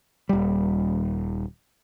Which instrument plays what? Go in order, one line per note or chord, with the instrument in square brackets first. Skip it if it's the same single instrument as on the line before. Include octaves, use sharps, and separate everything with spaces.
[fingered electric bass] D#1 G3